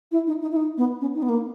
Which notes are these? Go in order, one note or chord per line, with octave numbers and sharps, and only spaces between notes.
E4
D#4
D#4
E4
D#4
B3
C#4
D#4
B3
A#3